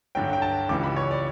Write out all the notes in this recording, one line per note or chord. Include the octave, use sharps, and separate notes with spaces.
G2 D3 F#3 G5
G5
A5
C#2 C#3 E3 G3 D6
B5
C#5
D5